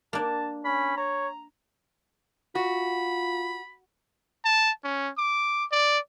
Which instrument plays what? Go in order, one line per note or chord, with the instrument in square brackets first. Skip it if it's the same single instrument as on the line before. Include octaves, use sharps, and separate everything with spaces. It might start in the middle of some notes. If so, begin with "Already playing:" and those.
[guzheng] A#3 D4 [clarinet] A5
[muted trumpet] C#4 [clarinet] B5
[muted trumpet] C#5 [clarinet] A#5
[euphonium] F4 [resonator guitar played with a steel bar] F#4 [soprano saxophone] B5
[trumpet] A5
C#4
D6
D5